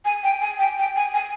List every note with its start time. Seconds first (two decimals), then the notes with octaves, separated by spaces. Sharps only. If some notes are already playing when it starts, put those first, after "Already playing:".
0.05 G#5
0.23 G5
0.41 G#5
0.59 G5
0.78 G5
0.96 G#5
1.14 G#5